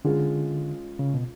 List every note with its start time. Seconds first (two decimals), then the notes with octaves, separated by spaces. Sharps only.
0.05 D3 G#3 C#4 F4 G#4
0.99 C#3
1.14 B2